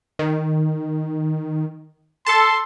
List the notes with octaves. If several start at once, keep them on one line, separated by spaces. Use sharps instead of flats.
D#3
A4 A5 C6